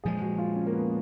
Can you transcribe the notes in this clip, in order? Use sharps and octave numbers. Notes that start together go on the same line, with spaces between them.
A#2 F3 G#3 G#4
F#4
F4
C#4
A#3
B3